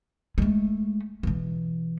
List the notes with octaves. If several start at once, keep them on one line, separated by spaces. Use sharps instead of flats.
G#3 A3
B2 E3